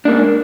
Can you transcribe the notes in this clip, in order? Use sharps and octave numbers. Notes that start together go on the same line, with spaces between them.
G#2 A#3 D4